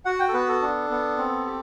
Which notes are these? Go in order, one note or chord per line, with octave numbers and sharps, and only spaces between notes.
F#4 F#5
G5
A4
B3 B4
A4
D4
B3
C4
G4